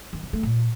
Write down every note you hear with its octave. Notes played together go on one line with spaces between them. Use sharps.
D#3
C#3
A3
A#2